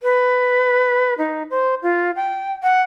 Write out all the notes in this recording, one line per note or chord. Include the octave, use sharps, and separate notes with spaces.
B4
D#4
C5
F4
G5
F#5